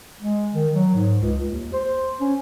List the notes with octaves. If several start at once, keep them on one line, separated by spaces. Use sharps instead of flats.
G#3
D#3
F#3
G#2
C#2
D#2
C5
C#4